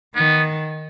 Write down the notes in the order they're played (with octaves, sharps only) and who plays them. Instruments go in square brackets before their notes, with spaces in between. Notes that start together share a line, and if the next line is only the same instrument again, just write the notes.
[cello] D#3 [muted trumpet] B3